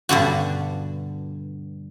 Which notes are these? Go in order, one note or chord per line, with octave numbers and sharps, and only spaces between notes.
G2 B2 D3 F#4